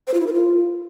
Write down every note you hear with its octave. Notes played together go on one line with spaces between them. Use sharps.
C5
F4
E4
A#4
F4